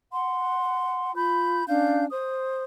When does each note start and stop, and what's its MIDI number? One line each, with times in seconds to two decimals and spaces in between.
0.13 1.14 78
0.13 1.14 84
1.15 1.64 65
1.15 1.64 83
1.15 1.64 91
1.68 2.05 61
1.68 2.05 62
1.68 2.05 77
1.68 2.05 91
2.11 2.64 72
2.11 2.64 87